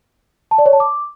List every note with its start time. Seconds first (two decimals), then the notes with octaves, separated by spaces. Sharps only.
0.51 A5
0.58 D5
0.66 C#5
0.73 A5
0.80 D6